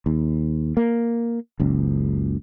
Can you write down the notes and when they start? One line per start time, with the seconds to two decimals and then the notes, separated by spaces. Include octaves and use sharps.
0.06 D#2
0.77 A#3
1.60 F#1 C#2